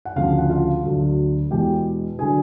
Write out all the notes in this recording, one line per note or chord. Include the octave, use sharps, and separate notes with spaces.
F#5
D2 C#3 F3 F4 F5
F#5
F4 F5
D2 D3 F#3
E2 B2 G#3 G4 G5
D3 F#3 G#4 G#5